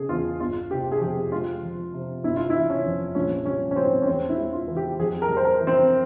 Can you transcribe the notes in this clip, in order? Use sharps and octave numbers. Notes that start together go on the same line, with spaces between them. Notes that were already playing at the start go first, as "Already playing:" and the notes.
Already playing: C#3 G#4
E2 F4
G1 F4
C3 G4
G#4
F2 G4
G#3 F4
F3
C3
G1 E4
F4
E4
E3
C#4
F2
A#1 C#4
G3 C#4
C#4
G#2 C4
C#4
E2 C4
E4
G#3
F4
E3
G4
F2 G#4
A#4
G3
C5
A#4
E3
C4